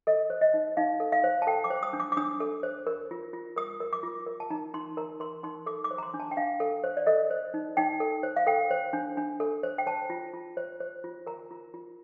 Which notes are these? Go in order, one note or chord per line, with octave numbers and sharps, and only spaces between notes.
A4 D#5
C5
D#5
D#4
D#4 F5
A4
F5
C5
A5
A4 G5
D6
C5
D#6
D4
D6
D6
D4 D#6
A4
C5
A#4
F4
F4
A#4 D#6
A#4
D6
F4
A#4
A5
D#4 A#5
D#4 C6
A#4 A#5
A#4 C6
D#4 C6
A4 D6
D6
C5
A#5
C6
D4
A5
G5
D4 F5
A4
C5
D5
A4 D#5
C5
D#4
D#4 G5
A4
C5
F5
A4 G5
C5
D4
D4
A4
C5
G5
C5 A5
F4
F4
C5
C5
F4
A#4 A#5
F4
F4